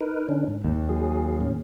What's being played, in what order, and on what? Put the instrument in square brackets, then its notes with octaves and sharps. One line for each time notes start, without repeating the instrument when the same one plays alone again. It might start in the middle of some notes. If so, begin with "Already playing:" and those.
[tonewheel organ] D#4 A#4 B4
D3 C#4 D4
G#2
[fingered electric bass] D#2
[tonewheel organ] F#3 G#4
A2 C#4